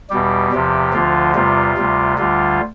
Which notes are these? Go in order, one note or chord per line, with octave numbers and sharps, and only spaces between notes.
E2 B2 G3 G4
E2 C3 F3
D2 D3 F3 F4
E2 C3 G3 F4
D2 C3 G3
D2 D3 G3 F4